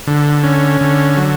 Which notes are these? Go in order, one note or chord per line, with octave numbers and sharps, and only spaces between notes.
D3
C#4
D3
F#3